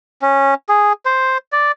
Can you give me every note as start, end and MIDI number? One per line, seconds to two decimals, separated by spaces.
0.22 0.54 61
0.69 0.93 68
1.06 1.38 72
1.52 1.72 74